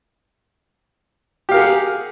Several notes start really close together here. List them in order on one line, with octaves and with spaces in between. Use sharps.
G4 F5 A#4 G#4 F#5